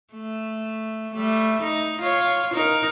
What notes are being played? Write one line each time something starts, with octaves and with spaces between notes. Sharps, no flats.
A3
G3 A3
D#4
F4 C#5
D#4 A#4